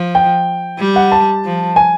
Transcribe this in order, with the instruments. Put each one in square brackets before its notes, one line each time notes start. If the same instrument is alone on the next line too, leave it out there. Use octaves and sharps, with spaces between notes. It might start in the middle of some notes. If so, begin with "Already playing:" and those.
Already playing: [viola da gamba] F3
[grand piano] G5
[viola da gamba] G3
[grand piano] F#5
A5
[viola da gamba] F3
[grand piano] G#5